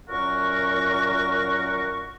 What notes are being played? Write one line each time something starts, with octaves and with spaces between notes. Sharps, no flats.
F#2 A#2 A#4 F#5 C#6